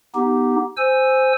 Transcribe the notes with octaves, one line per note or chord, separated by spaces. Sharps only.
B3 D#4 G4
C5 G#5 E6